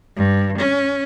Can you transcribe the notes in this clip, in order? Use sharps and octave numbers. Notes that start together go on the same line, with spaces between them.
G2
C#4